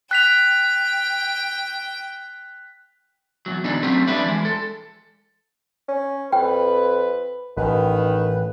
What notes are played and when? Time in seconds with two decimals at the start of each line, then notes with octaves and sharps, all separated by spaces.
0.11 G5 F#6 B6 F7
3.46 E2 G2 F#3
3.64 E2 B2 D3 D4 D#4
3.83 F#3 G3 A3 C4 C#4
4.07 F3 G3 D4 B4 D5 E5
4.26 E3 G#3
4.45 A4
5.88 C#4
6.32 F2 B4 G5
7.57 A1 D#3 B4